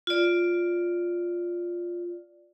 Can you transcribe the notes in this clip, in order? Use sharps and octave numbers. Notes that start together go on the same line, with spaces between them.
F4 D5